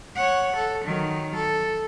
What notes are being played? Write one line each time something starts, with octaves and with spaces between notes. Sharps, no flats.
C#5 F#5
A4
D#3 F#3
A4